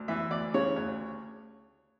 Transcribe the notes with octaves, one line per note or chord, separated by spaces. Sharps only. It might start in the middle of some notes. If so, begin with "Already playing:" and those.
Already playing: D2
E3 E5
D2 D5
C#3 C#5
D2 C#5